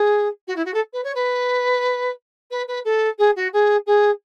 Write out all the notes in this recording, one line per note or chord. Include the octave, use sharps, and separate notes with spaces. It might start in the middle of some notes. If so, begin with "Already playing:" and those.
Already playing: G#4
F#4
E4
F#4
A4
B4
C#5
B4
B4
B4
A4
G#4
F#4
G#4
G#4